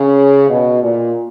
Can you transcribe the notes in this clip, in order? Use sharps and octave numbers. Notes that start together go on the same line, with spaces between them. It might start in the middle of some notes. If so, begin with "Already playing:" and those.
Already playing: C#3
B2
A#2